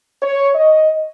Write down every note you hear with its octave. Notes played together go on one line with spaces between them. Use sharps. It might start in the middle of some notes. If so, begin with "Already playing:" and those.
C#5
D#5